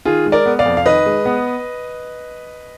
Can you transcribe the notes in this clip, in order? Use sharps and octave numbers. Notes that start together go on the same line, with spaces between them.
D#3 F4 G#4
G#3
A#4 D5
B3
D5 F5
F2
F5
D#3 B4 D#5
G#3
B3